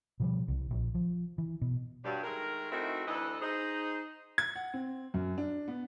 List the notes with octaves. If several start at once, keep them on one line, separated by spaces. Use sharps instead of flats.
B2 F3 G3
C2
A#1
F3
E3
B2
G2 F#3 G3
D#3 G#3 A3 A#4
A3 C4 D#4 E4 F#4 A#4
D2 E3 A4 B4 D#5
D#4 G#4 C5
G#6
F#5
C4
F#2
D4
B3